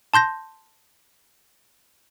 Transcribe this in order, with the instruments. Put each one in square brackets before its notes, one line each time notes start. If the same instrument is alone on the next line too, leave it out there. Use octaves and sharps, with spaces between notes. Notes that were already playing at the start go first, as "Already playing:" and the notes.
[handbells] A5 C6 G6 A#6